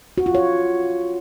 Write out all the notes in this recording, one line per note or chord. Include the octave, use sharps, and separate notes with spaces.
F#4
F4
C#5